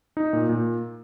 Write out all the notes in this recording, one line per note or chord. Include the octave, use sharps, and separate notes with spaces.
D#4
A#2
A#2